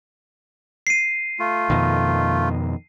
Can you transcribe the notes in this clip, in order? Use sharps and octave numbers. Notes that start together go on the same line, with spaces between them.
C7 D#7
A3 F4
F2 B2 D#3